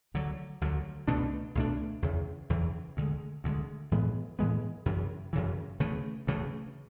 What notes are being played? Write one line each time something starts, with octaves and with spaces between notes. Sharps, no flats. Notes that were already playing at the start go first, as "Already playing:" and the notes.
D2 D3 F#3
D2 D3 F#3
C#2 B2 A3 D4
C#2 B2 A3 D4
E2 C#3 E3
E2 C#3 E3
D2 D3 G#3
D2 D3 G#3
A2 E3 G#3 B3
A2 E3 G#3 B3
F#2 C#3 E3
F#2 C#3 E3
D2 C#3 E3 A3
D2 C#3 E3 A3